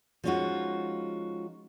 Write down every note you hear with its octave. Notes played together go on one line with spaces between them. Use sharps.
F3 G#3 C#4 D#4 F4 F#4